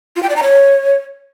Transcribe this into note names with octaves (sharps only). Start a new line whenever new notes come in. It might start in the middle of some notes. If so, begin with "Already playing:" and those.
F4
G5
D5
A#5
C#5